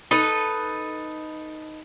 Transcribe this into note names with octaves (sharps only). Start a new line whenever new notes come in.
D#4 A4 B4